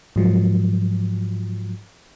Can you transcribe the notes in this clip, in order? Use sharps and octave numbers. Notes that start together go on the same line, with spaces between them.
G#2 F3 F#3